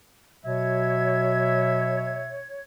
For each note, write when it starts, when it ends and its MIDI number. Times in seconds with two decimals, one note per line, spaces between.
0.46 2.50 47
0.46 2.19 54
0.46 2.62 73
0.46 2.39 76
0.46 2.62 92